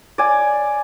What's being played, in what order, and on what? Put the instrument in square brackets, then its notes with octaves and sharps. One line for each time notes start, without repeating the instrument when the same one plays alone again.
[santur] D5 G#5